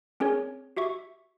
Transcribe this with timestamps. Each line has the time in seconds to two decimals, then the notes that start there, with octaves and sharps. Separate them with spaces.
0.20 C4 C#4 G#4 A#4 C#5
0.77 F#4 G4 E5 C#6